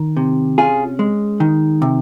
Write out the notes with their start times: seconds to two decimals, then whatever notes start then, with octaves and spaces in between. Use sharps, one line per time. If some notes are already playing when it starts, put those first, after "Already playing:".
Already playing: D#3
0.17 C3
0.58 C#4 F4 G#4
0.99 G#3
1.40 D#3
1.82 C3